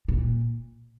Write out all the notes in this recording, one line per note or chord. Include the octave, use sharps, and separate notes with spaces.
A#2